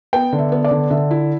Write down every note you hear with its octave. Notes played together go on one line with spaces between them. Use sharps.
B3 G5
D3
E5
B3
D5
D3
D3 E5
E4